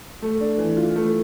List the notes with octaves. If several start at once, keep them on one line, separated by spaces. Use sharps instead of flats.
A3
D4
E3
F4
A3